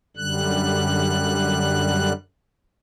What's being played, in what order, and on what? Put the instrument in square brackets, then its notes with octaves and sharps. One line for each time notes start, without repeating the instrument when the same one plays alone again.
[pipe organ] F#2 D3 G3 F#6